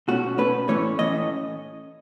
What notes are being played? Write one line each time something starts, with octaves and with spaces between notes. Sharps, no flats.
B2 A3 C#4 F#4
B2 A3 C#4 B4
A2 E3 A3 C#4 C#5
A2 E3 A3 C#4 D#5